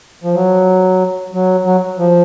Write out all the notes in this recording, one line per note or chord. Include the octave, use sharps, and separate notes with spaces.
F3
F#3
F#3
F#3
F3